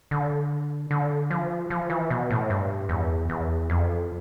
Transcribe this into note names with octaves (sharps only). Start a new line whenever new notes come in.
D3
D3
F3
F3
E3
B2
A2
G2
E2
E2
F2